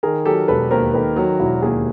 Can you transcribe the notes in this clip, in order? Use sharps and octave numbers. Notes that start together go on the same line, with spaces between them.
D#3 G#4 A#4
F#3 G4 A4
E1 A4 B4
D#2 A#4 C5
D#3 A4 B4
F#3 A4 B4
E1 E4 F#4
D#2 G#4 A#4